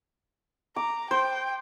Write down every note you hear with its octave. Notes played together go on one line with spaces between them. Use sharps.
A#5 D6
C5 G5